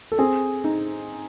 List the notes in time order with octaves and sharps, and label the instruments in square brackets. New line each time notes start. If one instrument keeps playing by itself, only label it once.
[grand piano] A4
[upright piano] C4 [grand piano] G#4
[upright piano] D#4